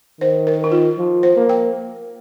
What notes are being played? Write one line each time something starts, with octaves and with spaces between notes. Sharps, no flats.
D#3 C5
A#4
D#4
F4
F3
C5
A#3
G5